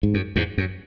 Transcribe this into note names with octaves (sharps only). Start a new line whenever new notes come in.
G#2
F#2
E2 G#2
F#2